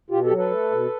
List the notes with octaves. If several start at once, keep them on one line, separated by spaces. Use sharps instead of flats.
B2 F4 G4
G4 A4
F#3
A4 B4
A3
B2